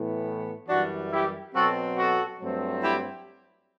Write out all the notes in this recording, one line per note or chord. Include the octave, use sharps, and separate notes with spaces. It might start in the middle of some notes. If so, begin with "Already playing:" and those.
Already playing: A2 E3 B3
F#2 E3 G3 D4 F#4
E4 G4
B2 F#3 C4 F#4 A4
F#4 A4
G2 F#3 A3 C4
E4 G4